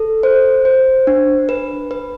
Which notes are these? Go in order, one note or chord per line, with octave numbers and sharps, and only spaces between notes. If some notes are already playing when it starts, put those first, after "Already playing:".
Already playing: A4
C5
C5
D4
B4
B4